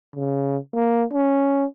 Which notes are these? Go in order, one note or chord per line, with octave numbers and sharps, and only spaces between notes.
C#3
A#3
C#4